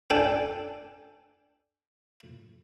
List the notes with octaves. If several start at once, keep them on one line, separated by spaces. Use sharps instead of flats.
D4 A4 G5 G#5